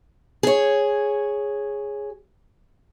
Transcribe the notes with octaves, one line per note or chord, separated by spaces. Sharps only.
G#4 C#5